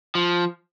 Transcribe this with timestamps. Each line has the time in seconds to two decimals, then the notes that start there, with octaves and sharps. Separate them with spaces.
0.15 F3